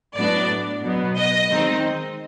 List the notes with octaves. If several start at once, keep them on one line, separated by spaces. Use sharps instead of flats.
A2 F#3 B3 D4 D5
B2 F#3 B3
D#5
D#3 G#3 C4 D#4